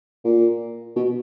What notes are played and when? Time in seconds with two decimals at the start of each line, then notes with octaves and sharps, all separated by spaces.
0.25 A#2
0.96 B2